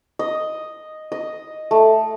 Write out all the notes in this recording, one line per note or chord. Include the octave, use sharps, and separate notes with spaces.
D#5
D#5
A3